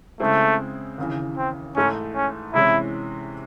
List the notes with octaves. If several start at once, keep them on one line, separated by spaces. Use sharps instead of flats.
C#3 G#3 A3 C4 E4
D#2 C#3 E3
C4
G#2 E3 A3 C#4 D#4
C#4
C3 E3 G#3 C#4 E4